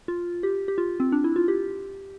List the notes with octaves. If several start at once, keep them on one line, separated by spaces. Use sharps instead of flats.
F4
G4
G4
F4
C4
D4
E4
F4
G4